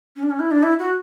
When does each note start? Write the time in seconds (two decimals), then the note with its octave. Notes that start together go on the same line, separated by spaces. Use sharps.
0.16 C#4
0.23 D4
0.30 C#4
0.40 E4
0.51 D4
0.63 E4
0.79 F#4